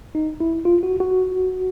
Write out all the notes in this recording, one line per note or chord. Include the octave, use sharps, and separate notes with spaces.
D#4
E4
F4
F#4
F#4